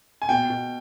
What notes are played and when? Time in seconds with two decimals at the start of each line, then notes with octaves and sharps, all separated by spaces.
0.22 G#5
0.29 B2 G5
0.50 B2